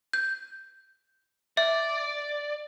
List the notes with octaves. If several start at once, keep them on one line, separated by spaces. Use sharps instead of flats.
G6
D5 E5